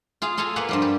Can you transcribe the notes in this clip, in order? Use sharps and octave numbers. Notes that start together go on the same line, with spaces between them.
F4 G#4 F5
F4 A4 F5 G#5 A#5
A#3 B4 F5 F#5 G#5
G2 F3 G3
G4